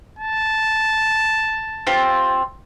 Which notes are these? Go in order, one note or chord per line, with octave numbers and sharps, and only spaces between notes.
A5
C4 F4 G4